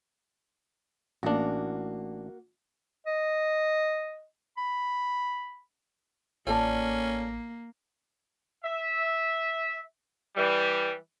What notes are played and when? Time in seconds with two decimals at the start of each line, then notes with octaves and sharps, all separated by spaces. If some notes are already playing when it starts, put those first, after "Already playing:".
1.23 A1 A#3 D4 F#4
3.07 D#5
4.58 B5
6.47 A1 A#3 C#4 F4 A4 D5
8.64 E5
10.36 E3 G3